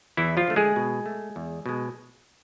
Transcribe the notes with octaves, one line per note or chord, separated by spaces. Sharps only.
E2 E3 E4
F3 F4
D3 A3
G#3 G#4
B2
A3
E2
B2 G#3